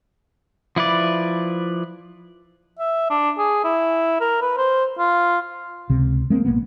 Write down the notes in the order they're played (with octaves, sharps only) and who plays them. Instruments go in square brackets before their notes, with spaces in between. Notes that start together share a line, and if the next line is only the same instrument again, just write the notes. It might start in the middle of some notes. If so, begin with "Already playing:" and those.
[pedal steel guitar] F3 E4 B4 D5
[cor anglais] E5
D4
G#4
E4
A#4
B4
C5
F4
[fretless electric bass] C#2 C3
G#3 A#3 C4
A#1 A2 A#3 B3